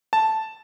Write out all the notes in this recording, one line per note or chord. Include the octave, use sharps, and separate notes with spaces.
A5